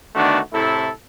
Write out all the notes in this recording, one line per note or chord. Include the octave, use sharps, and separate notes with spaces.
D3 D#3 A3 B3 D4 F#4
A2 C3 A3 E4 A4